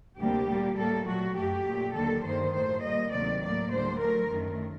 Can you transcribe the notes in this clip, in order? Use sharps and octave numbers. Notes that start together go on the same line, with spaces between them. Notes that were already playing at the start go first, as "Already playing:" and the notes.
D2 C3 G3 A#3 G4
A#2 G3 A#3
A2 G3 A#3 A4
A#2 F#3 A3 F#4
F#2 F#3 A3 G4
A#2 F#3 A3
D#2 D3 F#3 A#3 A4
G2 D#3 G3 A#3 C5
A2 F#3 A3 C5
A#2 G3 A#3 D#5
D2 C3 D#3 F#3 A#3 D5
A2 F#3 A#3 D5
D2 D3 G3 C5
A2 F#3 A3 A#4
F#2 D#3 A3